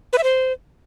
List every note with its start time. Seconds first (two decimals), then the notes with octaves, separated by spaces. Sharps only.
0.13 B4
0.18 E5
0.23 C5